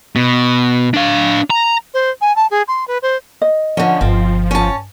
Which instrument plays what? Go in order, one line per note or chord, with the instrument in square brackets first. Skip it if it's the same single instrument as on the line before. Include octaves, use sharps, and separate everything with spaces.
[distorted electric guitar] B2
D4 F5
A#5
[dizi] C5
G#5
A5
G#4
C6
B4
C5
[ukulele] D#5
[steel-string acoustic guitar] D3 C#4 [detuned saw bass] F3
[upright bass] G1 [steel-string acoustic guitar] C4
[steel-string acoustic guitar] C#4 A5